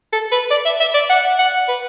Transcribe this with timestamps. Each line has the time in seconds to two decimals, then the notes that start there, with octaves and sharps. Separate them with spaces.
0.13 A4
0.32 B4
0.51 D5
0.66 E5
0.80 E5
0.95 D5
1.09 F#5
1.39 F#5
1.69 B4